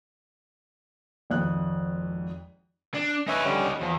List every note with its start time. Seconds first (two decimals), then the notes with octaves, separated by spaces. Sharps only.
1.30 G#1 F2 F#6
2.95 D4
3.27 D#4 B4 C#5 E5 G#5
3.45 D3 G3 C#4
3.81 E2 F3